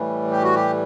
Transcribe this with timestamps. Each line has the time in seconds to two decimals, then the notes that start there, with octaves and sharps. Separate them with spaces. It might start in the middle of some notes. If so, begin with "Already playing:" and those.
Already playing: A2 E3 G3
0.32 G4
0.43 F#4
0.55 G4